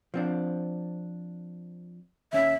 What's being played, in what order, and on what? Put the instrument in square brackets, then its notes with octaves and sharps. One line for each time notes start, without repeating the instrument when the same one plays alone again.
[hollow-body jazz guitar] F3 C4 D4
[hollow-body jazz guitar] D#2 C#4 [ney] E5